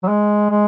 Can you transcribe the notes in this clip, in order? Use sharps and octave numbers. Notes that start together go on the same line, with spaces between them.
F#3
G#3
G#3